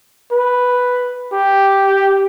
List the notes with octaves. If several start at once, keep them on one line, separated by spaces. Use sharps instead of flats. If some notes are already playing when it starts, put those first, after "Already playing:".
B4
G4